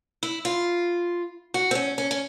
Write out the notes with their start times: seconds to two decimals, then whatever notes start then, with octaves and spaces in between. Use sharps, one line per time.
0.23 E4
0.45 F4
1.54 F#4
1.71 C4
1.75 C#4
1.98 C#4
2.11 C#4